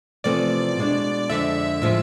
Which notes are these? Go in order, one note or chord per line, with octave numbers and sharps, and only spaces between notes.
E2 C3 F3 A3 C4 D5
B2 G#3 D4
F2 D3 G#3 E5
A2 F3 G#3